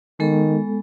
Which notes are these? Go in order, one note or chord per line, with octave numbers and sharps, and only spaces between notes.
D#3 G#3 B3 A4